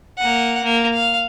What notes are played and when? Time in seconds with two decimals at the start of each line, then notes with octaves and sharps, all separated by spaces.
0.18 A#3 F#5
0.64 A#3
0.94 F5